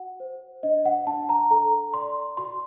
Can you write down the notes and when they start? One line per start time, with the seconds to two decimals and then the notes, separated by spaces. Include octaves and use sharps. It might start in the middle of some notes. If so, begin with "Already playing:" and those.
Already playing: F#4 F#5
0.20 C5
0.63 D4 D#5
0.85 F#5
1.07 D4 A5
1.29 A#5
1.51 A4 A#5
1.94 D5 C6
2.37 F#4 C6